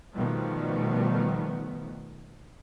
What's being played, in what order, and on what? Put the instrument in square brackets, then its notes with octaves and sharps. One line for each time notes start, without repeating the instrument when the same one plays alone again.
[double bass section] B2 D#3 F3 G3 A3 B3